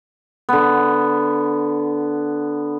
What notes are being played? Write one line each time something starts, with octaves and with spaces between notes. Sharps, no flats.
D3 B3